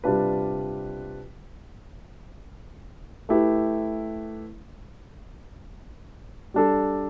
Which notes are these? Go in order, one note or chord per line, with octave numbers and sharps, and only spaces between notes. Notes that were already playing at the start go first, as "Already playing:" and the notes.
C3 G3 D4 F4 B4
A3 E4 G4 B4
G3 D4 A4